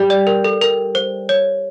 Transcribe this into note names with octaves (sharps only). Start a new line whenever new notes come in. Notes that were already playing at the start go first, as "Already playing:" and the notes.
Already playing: G3
D5
A#4
A4
A#4
C5
C#5